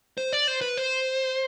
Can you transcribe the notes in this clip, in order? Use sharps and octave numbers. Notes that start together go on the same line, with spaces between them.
C5
D5
C5
B4
C5